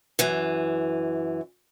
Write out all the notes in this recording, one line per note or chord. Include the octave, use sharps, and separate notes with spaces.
F#2 E3